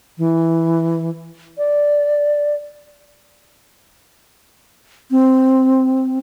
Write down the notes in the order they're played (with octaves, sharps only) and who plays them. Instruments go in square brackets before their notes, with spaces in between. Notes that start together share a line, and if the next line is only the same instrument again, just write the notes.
[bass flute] E3
D5
C4